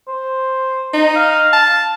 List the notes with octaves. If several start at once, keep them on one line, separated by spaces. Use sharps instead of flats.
C5
D#4
F5
A5